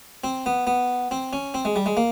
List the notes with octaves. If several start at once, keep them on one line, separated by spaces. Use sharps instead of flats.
C4
B3
B3
C4
C#4
C4
G#3
G3
G#3
A#3